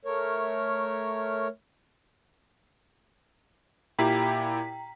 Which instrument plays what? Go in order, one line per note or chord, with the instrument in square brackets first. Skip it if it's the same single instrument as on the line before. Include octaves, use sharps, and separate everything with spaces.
[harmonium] A3 A#4 C#5
[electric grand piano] A#2 E4 G4 [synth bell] G5 A#5 B6